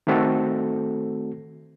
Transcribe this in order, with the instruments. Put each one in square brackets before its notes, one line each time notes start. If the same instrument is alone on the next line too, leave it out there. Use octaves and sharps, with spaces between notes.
[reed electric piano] D#3 A3 C4 F#4 A4